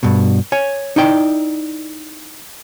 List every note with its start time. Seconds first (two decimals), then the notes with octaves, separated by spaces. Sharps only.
0.03 G2 B2
0.52 C#5 G#5
0.96 D#4 E4 D5 G5